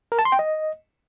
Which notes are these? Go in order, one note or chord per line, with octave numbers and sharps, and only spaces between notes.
A#4
A5
C6
G5
D#5